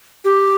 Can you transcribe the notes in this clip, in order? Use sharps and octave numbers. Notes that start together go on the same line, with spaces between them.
G4